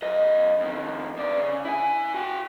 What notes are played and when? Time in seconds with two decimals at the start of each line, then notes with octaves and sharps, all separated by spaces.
0.03 F#2 D#5
0.60 F2 D#3
1.17 F2 D5
1.38 C#3
1.65 E4 G#5
2.14 F#4 G5